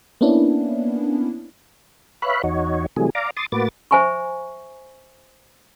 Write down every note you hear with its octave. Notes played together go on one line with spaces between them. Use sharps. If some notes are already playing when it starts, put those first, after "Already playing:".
A#3 B3 C#4 D4 E4
B4 C#5 E5 F5 B5 F#6
E2 D#4 F#4 C#5
C3 E3 F#3 G3 A3 G#4
D5 F5 A#5 D6
C6 D6 D#6 A6
A2 A#3 F#4 B4 D6 A6
C5 E5 G#5 B5 C#6